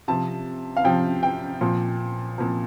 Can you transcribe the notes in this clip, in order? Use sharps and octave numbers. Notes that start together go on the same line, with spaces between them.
C3 F3 A5
F5
C3 F3 G5
G5
A#2 F3
A#2 F3